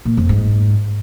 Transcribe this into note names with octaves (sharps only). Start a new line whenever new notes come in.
A#2
F2
G#2